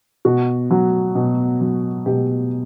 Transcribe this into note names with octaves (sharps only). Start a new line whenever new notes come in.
B2 F#4
F#3
B2
F#3
B2 G4